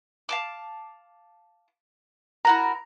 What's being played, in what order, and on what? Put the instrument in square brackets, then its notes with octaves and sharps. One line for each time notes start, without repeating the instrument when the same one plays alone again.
[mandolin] F5 A5 D6
[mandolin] E4 F#4 A#4 [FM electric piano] A#5